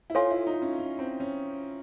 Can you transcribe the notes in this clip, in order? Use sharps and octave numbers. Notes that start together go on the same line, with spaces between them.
E4
F4 A4 C#5 F5 G#5 C6
E4
D#4
C#4
C#4
C4
C#4